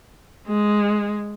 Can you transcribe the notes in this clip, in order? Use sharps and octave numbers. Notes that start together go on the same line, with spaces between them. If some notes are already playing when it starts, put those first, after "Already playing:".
G#3